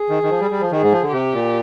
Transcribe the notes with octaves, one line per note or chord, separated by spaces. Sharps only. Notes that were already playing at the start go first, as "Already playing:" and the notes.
Already playing: G#4
D#3
D#3
F3
G3
G3
F3
D#3 G#4
G#2
F3
D3
C3 G4
A#2